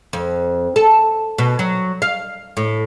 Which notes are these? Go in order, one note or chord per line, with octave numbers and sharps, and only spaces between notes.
F2
A4
B2
F#3
F5
A2